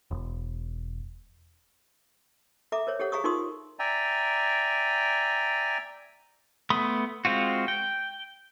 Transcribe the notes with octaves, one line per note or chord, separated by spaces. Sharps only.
E1
A4 E5 A#5 D6
A#4 C5 C#5
G4 A4 C#5 F#5
G#4 F5 A#5 C#6 D#6
D#4 F4 A#4 C6 C#6 D#6
D5 E5 G5 G#5 A#5
A3 B3 B5 C6 D#6
G#3 C4 F4 F#4
G5